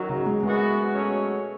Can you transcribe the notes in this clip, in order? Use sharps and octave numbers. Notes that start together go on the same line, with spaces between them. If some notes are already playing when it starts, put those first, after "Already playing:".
Already playing: F#2 D#3 F#3
C#3
G#3
F#2 E3 G#3 B3 F#4
B2 F#3 A3 C#4